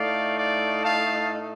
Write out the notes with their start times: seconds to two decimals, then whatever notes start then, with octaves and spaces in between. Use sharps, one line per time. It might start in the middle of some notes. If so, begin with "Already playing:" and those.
Already playing: A2 A3 D#4 D5 F5
0.37 D5 F5
0.82 F5 A5